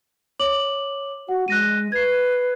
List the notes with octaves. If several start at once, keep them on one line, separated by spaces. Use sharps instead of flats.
C#5 D6 F#7
F#4 F#5
G#3 F#6 A#6 D#7
B4 G#6 C7